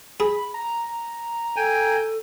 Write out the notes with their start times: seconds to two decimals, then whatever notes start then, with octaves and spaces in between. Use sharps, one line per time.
0.20 G#4 B5
0.54 A#5
1.56 A4 G5 G#5